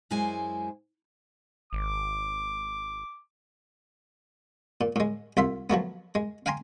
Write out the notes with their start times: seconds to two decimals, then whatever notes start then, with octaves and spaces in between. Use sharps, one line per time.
0.10 F#2 G#3 E4 C5 G#5
1.73 G#1 D6
4.81 A#2
4.96 A2 G#3
5.37 C2 F4 E5 C6
5.70 F3 F#3 A3 B3
6.15 G#3
6.46 F5 G5 G#5 A#5 C6